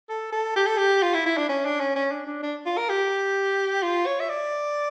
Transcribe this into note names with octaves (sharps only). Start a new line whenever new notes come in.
A4
A4
G4
A4
G4
F4
E4
E4
D4
C#4
D4
C#4
C#4
D4
D4
D4
F4
A#4
G4
F4
C#5
E5
D5